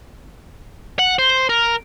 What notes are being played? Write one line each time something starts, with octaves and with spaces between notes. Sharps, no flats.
F#5
C5
A#4